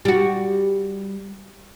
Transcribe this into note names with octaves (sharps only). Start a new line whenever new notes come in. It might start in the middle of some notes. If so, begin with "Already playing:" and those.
G3 F#4